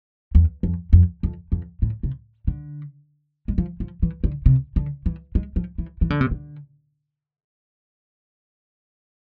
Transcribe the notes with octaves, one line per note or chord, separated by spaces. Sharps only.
E2
F2
F2
F2
F2
A2
C3
D3
G#3
F3
F3
E3
D3
C3
D3
E3
G#3
F3
E3
E3
D3
C3
D3